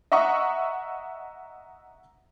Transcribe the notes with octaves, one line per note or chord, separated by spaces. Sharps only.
D#5 E5 F#5 A#5 C#6 D#6